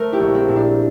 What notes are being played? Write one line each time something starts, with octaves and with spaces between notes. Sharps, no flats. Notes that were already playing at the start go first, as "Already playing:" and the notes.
Already playing: A3 A#4 C5
E4 G4
A#1
C4
A#2
D4